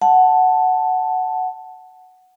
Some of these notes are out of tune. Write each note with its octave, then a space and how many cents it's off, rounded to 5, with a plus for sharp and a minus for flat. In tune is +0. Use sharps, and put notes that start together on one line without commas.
F#5 +0 A5 +0